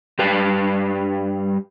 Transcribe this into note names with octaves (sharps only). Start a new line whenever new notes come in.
G2 G3 G4 B4 F5 A5